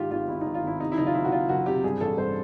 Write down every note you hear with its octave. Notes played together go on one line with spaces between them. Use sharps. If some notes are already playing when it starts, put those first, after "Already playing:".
Already playing: G#2 D#3 F4 G4
G#1 F4
G#1 E4
D#4
G#1
F4
G#1 E4
C3 D#4
E4
F#1 D#4
F4
F#1 E4
F#4
F#1 F4
F#1 F#4
C3 G4
G2 G#4
A1 A4
G2 C5